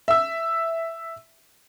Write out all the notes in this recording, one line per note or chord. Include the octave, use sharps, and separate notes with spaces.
E5 E6